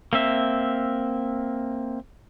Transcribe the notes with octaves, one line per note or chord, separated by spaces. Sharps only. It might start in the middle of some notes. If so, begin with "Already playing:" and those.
A#3 C4 E5